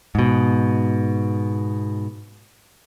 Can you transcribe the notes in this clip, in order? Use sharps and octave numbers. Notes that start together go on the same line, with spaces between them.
G#2 B2